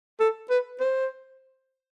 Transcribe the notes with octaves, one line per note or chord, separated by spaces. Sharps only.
A4
B4
C5